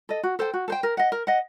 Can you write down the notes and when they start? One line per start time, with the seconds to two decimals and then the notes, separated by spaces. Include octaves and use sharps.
0.09 A4 D#5
0.23 F#4
0.39 A4 C5 G5
0.54 F#4
0.68 A4 C5 G5
0.83 A#4
0.97 D#5 F#5
1.12 A#4
1.27 D#5 F#5